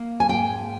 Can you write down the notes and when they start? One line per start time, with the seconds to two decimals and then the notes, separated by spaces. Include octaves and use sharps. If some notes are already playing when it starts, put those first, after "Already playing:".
Already playing: A#3
0.20 G#5
0.29 G#2 G5